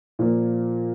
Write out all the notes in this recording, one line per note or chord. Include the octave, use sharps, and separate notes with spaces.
A#2 F3 A#3